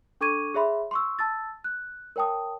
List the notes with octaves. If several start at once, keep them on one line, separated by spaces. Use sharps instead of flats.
D4 A4 C#6 D6 G#6 D#7
G#4 C#5 E5 B5 C6
C6 C#6 E6
A5 E6 A6
F#6
A#4 C#5 G5 A5 D#6